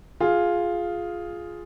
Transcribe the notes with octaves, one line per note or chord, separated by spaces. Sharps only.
F4 G#4